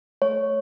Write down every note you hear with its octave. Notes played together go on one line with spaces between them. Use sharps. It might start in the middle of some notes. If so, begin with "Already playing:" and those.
A3 C#5